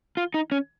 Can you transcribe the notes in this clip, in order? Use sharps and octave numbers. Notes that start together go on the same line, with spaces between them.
F4
D#4
C#4